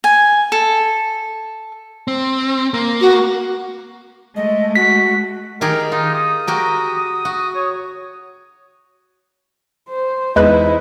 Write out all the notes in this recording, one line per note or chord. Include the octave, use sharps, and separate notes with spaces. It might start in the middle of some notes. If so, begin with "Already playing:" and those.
G#5
A4
C4
A#3
F#4
G#3 A3 D#5
F#4 B6
D#3 G4 G#4 A#4
D#4 F4
D#6
F#4 G4 A#4
F#4
C#5
C5
E2 G#3 D#4 E4 B4